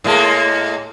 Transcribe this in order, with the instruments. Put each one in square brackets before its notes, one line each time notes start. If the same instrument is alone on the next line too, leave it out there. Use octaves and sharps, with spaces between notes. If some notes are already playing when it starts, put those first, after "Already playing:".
[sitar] A2 G#3 A#3